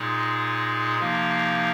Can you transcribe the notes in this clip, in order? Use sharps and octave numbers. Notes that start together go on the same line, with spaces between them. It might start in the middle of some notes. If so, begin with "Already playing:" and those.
Already playing: A#2 G#3 D#4 G#4
C3 F3 A#3 D#4